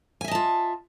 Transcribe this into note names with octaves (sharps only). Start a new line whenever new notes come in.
F4 D#5 E5 G#5 A5